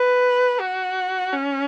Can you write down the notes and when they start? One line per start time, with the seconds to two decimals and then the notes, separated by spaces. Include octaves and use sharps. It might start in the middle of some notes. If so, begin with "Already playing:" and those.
Already playing: B4
0.60 F#4
1.32 C#4